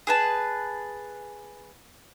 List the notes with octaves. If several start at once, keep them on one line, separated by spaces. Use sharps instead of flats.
G#4 B4 A5